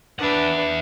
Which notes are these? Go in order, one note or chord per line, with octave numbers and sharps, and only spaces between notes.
D4 B4 E5 F#5